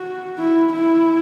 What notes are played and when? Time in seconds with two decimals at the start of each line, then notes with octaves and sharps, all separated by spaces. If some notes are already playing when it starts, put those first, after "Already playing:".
Already playing: F#4
0.38 E4
0.73 E4